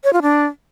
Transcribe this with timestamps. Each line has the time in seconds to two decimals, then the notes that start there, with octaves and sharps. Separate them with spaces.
0.04 C#5
0.13 F4
0.22 D4